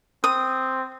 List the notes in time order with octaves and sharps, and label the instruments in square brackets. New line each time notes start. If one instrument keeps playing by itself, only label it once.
[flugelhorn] C4 [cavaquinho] D#6